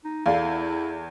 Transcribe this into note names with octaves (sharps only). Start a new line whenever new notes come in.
D#4
E2 E4 A4 D5 F5